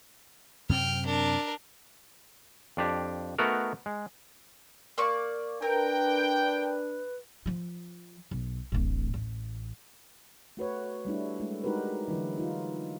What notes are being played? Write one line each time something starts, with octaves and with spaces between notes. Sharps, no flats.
F#2 C3 C4 G5 F6
D4 A#4
F2 D4 G4
A3 B3 D#4 F#4 A#4
G#3
A#3 D5 C#6
D4 A#4 B4 G5
F3 F4
B1
D1 A1
A1
A3 F#4 B4 C#5
G3 A3 D4 E4
G#3 A3 E4
G#3 D#4 F#4 G4 A#4 B4
D3 E3 F#3 E4
D#4 F4